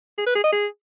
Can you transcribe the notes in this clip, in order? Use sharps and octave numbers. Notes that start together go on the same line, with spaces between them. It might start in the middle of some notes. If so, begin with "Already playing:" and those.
G#4
B4
G#4
D#5
G#4